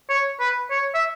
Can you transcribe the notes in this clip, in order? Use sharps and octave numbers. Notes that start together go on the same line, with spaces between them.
C#5
B4
C#5
E5